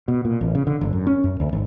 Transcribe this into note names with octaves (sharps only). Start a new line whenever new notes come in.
B2
A#2
A1
C#3
D3
G1
F#2
C#4
F#2
D2
G#1